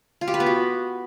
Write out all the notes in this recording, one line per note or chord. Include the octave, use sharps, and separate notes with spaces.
F4
G4
B4
B3
F#4